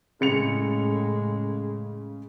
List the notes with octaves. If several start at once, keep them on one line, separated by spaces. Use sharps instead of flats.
A2 C#3 G#3 C#7 F7